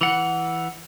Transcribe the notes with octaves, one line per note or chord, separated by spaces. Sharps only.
E3 F#5